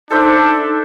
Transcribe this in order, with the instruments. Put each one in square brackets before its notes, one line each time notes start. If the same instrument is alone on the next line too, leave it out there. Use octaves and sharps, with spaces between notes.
[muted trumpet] D4 [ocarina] D#4 [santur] A4 C5 E5